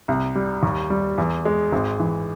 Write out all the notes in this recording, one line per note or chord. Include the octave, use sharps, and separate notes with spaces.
C2
G3
D#2
G3
E2
G#3
G#1
E3